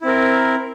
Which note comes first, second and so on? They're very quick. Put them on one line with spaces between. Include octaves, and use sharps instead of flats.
E4 C4 A#4